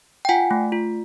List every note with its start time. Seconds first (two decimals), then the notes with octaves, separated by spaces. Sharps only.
0.25 G5
0.29 F4 F#5 G#5
0.51 A3
0.72 F4